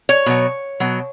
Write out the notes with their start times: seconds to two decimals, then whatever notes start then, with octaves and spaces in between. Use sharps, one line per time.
0.09 C#5
0.26 B2 F#3
0.80 B2 F#3